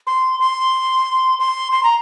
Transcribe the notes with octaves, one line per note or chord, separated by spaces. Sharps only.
C6
C6
C6
C6
A#5